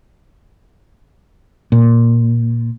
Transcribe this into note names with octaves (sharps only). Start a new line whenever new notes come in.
A#2